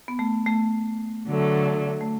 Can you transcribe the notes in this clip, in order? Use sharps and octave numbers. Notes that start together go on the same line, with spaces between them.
B3
A3
A3
D3 F#3 A3
A3